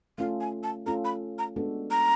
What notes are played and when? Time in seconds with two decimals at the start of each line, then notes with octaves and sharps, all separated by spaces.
0.18 A3 C#4 F4 A4 F5
0.41 G#5
0.63 A5
0.86 A3 C#4 F4 A4 A#5
1.05 B5
1.38 A#5
1.56 G#3 B3 D4 F#4 A4
1.91 A#5